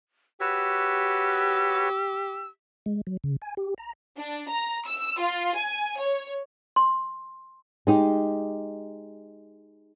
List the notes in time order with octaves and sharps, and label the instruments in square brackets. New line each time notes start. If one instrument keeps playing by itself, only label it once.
[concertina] F#4 B4 C#5 [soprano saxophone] G4 [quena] E6
[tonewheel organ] G#3
F#3
C#3
G#5
G4
A#5
[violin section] D4
A#5
E6
F4
G#5
C#5
[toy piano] C6
[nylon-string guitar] G#3 D#4 G4